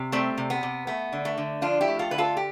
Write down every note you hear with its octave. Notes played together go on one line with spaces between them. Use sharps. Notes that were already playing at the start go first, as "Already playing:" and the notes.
Already playing: C3
G3 A3 C4
C3
B3
C3
A3 B3
D3
A3
D3
F3 D4 F4
E4 G4
A3
F4 A4
D3 B4
F4 A4
G4